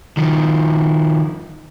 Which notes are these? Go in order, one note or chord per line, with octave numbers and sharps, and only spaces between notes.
D#3 F3